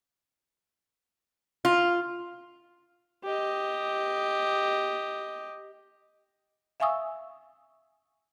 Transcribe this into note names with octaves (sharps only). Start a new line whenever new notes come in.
F4
G4 D#5
E5 F5 G#5 C#6 D#6 E6